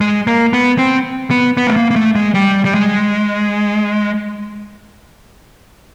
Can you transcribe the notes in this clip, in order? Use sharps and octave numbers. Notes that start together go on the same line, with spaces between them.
G#3
A#3
B3
C4
B3
B3
A3
A#3
A#3
A3
G#3
G3
G3
G#3